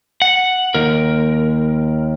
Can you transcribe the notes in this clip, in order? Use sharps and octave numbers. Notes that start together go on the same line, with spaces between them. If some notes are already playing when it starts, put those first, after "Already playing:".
F#5
D#2 A#4